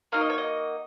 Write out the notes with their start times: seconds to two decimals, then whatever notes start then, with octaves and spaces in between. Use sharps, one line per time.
0.12 A#3 D#4 F#4 F5
0.21 D#5
0.30 C#5
0.38 D#5